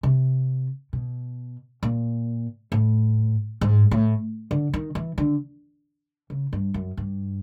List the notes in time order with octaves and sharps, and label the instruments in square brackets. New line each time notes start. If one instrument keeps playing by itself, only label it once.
[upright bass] C3
B2
A#2
A2
G#2
A2
D3
D#3
E3
D3
C#3
G2
F#2
G2